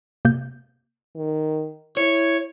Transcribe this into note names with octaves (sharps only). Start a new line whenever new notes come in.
C3 A#3 G6
D#3
E4 C#5